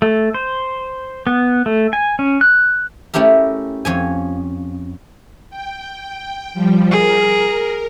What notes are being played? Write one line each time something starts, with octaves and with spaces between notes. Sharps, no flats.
A3
C5
B3
A3
G#5
C#4
F#6
A3 C#4 E4 G4 A#4
F2 C#4 G#5
G5
F3 G3
G#4 A#4